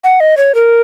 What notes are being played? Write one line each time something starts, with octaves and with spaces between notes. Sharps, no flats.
F#5
D#5
C#5
A#4